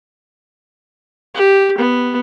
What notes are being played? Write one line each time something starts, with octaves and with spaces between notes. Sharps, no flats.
G4
B3